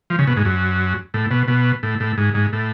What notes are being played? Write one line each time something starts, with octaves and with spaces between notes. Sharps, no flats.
F3
C#3
B2
G#2
F#2
A2
B2
B2
A2
A2
G#2
G#2
A2